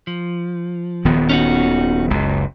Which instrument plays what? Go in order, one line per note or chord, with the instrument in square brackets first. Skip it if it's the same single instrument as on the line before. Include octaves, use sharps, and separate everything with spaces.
[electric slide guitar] F3
[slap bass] D#1 D#3 B3
[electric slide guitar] C#4 D#4 F#4
[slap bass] F#1 C#2